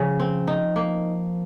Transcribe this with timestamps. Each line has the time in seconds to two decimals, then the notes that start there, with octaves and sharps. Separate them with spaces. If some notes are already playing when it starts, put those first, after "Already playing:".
Already playing: C#3 F3
0.20 C4
0.47 D#4
0.76 A#3